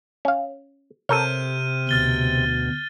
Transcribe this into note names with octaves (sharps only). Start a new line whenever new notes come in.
C#4 F5
C3 A4 A#4 C#5 F6 G6 D#7
D2 B2 F6 A6 G7